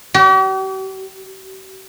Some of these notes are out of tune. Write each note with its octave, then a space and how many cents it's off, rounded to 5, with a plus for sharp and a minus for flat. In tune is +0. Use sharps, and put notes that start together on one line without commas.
G4 -45